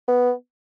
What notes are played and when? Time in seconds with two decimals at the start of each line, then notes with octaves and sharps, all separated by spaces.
0.08 B3